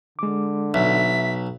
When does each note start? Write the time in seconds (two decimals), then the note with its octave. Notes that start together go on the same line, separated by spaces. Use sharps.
0.19 D3 G#3 D6
0.74 B1 E5 B6